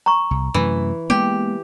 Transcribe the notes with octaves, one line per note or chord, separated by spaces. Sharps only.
A#5 C#6
C2
F#2 C3 E3 A3
G#3 A#3 B3 G4